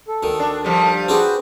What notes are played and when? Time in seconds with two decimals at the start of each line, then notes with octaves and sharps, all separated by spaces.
0.08 A4
0.23 D2 D#3
0.39 D4
0.64 D3 F3 G3
0.80 F5
1.09 C4 D4 F#4 G#4 B4 C5